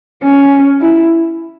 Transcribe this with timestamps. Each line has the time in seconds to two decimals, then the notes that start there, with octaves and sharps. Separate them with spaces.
0.22 C#4
0.81 E4